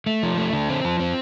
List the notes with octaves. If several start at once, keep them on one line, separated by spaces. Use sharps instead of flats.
A3
F3
A3
D3
C4
F3
C4